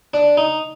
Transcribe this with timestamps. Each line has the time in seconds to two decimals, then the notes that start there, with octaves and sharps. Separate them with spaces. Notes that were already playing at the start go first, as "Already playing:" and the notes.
0.14 D4
0.37 D#4